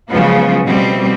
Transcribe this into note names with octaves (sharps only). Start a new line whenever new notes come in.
C#3 F3 F#3 G#3 B3 F4
B2 F3 G3 A3 C4